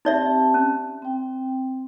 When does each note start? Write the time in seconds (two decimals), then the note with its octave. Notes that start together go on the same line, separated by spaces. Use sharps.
0.05 C4 D#4 G4 D5 E5 A5
0.54 C#4
1.02 C4 G5